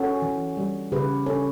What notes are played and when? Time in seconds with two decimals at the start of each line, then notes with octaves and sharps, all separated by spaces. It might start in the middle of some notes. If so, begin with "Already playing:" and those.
Already playing: C#4 F#4 A4
0.22 E3
0.57 G3
0.92 C#3 G4 B4
1.26 C#4 A4 C#5